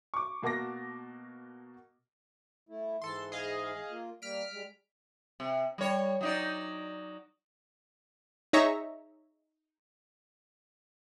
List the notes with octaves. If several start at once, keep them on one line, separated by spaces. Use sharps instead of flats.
C#6 D6
B2 A#3 F#4 A5 D6 A#6
A3 E4
G#2 E3 A4 C6
G#4 D#5 F5
A#3 F4
G3 A#3 F6 B6 D7
G3 G#3
C3
G3 C#5
F#3 D#4 D5
D#4 G#4 C#5 E5 A#5 C#6